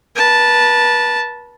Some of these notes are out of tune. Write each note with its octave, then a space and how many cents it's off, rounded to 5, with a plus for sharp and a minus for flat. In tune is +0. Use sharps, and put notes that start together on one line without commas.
B4 -35 A5 +0